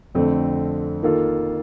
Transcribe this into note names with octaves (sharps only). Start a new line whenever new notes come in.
F2 D3 A3 C4
D#3 A#3 F4 A4